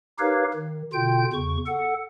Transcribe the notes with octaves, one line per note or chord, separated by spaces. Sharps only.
D#4 G4 A#4 B4 C#5 F5
D#3
B2 D3 F4 G5 G6
E2 C#3 C#6
A4 F#5